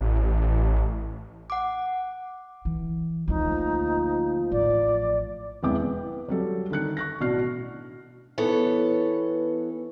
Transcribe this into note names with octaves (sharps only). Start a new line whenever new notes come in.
A1
F#5 D6
E3
D2 F3 A#3 D#4
A1 D5
E1 E3 B3 G5 D6
B3
F#3 G3 A4
D3 D#3 F#6 C#7
C#6 F#6 A#6
A1 B2 D4 F#4 F6 C7
E3 B3 A4 C#5